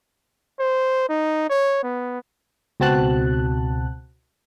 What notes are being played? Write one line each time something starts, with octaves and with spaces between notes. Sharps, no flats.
C5
D#4
C#5
B3
C#2 B2 C4 F#4 A5 F#6